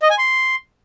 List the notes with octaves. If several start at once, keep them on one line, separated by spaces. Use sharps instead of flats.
D#5
G#5
C6